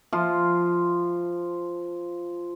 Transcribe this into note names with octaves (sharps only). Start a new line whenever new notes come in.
F3 F4